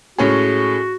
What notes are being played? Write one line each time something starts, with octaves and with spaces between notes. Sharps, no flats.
A2 G#3 C#4 F#4 G#4